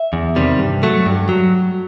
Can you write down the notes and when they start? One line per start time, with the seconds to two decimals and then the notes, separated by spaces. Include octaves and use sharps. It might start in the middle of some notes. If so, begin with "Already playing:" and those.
Already playing: E5
0.13 E2
0.36 C3 D#3 G3
0.59 G2
0.83 F#3 A3
1.06 G2
1.29 F#3